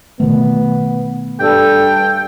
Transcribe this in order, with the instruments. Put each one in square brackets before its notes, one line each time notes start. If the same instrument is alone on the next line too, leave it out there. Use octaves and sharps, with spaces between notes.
[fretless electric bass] B2 D#3 A3 [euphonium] B3
[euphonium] G2 [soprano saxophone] A4 [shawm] G5